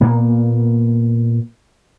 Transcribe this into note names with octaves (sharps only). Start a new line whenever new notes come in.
A#2 A#3 B3